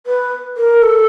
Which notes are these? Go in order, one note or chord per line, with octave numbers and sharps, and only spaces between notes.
B4
A#4
A4